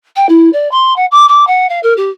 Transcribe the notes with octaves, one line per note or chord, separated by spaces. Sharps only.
G5
E4
D5
C6
F#5
D6
D6
F#5
F5
A#4
G4